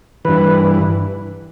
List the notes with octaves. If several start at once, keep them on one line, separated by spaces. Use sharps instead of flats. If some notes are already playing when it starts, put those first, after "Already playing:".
G2 E3 B4